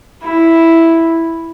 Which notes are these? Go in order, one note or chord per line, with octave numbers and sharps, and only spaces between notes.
E4